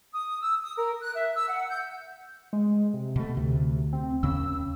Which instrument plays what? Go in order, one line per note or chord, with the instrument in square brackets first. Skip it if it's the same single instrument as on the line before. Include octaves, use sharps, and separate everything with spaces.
[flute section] D#6
E6
D#6
A#4
F#6
E5
E6
F#5
G6
[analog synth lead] G#3
C3
[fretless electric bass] B2 A3
[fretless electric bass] D2 [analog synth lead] C3
[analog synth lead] C4
[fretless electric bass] D#2 C#3 C#4 [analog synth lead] E6